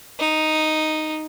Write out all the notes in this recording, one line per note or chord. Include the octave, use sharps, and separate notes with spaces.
D#4